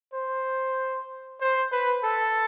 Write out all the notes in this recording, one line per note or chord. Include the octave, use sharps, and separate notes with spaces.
C5
C5
B4
A4